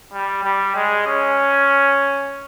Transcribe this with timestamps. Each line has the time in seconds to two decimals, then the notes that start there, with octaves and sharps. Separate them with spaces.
0.13 G3
0.44 G3
0.75 G#3
1.07 C#4